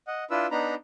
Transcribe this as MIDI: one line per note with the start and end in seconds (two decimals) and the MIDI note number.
0.07 0.24 75
0.07 0.24 78
0.30 0.47 62
0.30 0.47 64
0.30 0.47 65
0.30 0.47 71
0.30 0.47 88
0.51 0.75 59
0.51 0.75 62
0.51 0.75 63
0.51 0.75 82
0.51 0.75 83